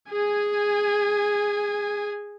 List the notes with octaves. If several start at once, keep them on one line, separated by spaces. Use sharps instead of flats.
G#4 G#5